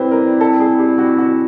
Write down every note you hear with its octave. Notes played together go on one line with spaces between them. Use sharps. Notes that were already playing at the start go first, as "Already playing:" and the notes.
Already playing: G3 C4 E4 B4 C5
A#4
A4
G#4
G4
F#4
F#4